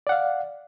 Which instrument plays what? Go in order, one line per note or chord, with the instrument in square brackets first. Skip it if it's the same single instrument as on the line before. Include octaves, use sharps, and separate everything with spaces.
[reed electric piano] D5
F#5
F5